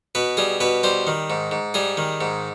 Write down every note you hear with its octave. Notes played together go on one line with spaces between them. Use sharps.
B2 B4
G3 G#4
B2 B4
G3 C5
D#3
G#2
G#2
G3 G#4
D#3
G#2